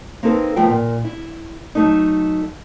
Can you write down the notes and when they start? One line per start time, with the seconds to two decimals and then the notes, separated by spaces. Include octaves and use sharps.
0.23 A#3 C4 D#4 A4 B4
0.56 D#2 F3 A3 B3 F4 G5
0.69 A#2
1.05 E4
1.75 F#3 A3 D#4